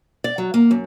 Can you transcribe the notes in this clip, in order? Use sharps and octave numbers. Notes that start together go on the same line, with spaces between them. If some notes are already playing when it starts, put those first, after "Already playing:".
D5
F#3
A#3
F#2